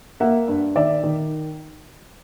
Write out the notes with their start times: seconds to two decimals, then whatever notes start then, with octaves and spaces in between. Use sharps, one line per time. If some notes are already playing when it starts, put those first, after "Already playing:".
0.20 A#3 E5 F#5
0.48 G2
0.75 D#3 D5 E5
1.04 D#3